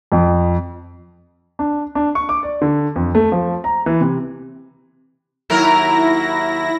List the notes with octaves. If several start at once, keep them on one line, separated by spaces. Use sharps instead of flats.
F2
D4
D4
C#6
D6
D5
D3
F2
A3
F3
A#5
E3
C3
D#2 F#3 E4 A#4 A#6